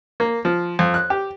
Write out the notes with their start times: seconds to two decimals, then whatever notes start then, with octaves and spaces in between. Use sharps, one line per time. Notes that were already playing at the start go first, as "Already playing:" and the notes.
0.20 A#3
0.45 F3
0.79 F2
0.94 F#6
1.10 G4